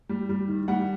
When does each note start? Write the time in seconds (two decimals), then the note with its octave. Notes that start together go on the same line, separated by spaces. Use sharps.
0.09 G3
0.29 G3
0.48 D#3
0.68 G3 F#5